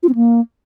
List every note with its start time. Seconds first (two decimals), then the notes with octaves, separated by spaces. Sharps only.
0.03 F4
0.09 C4
0.15 A#3